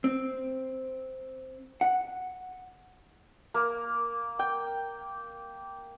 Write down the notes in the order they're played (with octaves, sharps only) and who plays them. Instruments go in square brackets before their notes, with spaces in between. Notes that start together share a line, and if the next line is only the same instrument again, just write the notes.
[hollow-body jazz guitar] C4
F#5
[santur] A#3
G5